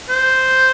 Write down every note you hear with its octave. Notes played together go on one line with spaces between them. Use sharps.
C5